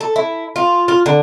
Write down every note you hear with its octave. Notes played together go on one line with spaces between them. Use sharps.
A4
E4
F4
F4
D3